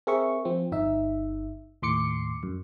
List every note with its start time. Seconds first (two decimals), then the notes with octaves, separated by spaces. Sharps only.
0.07 C4 G#4 A#4 E5 C#6
0.45 F3 C4
0.72 G1 D#4 E5
1.82 D#2 A2 C6 D6 C7 C#7
2.43 F#2